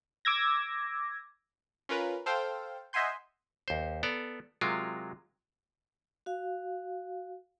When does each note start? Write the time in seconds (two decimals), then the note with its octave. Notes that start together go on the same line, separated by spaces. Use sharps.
0.25 D6 E6 G#6 A#6
1.89 C#4 F4 A#4 B4
2.26 A4 C5 F5 G5
2.93 D#5 E5 F#5 G#5 C6 G6
3.68 D#2 C5
4.03 B3 A4 D5 A#5
4.61 C3 F#3 G#3 F4 A#4
6.26 F#4 F5